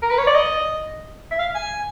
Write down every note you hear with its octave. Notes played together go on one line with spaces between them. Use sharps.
A#4
B4
C#5
D5
D#5
E5
F5
G#5